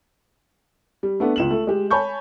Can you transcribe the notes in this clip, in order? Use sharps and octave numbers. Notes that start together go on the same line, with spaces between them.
G3
A3 B3 D4
C#2 E7 F#7
A3
G#3 G4
C#5 G#5 A5 B5 C#6 G6